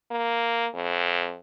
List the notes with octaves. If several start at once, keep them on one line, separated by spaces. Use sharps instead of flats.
A#3
F2